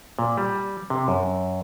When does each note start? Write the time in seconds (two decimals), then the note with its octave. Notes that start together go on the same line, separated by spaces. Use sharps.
0.19 A#2
0.37 G3
0.90 C3
1.08 F#2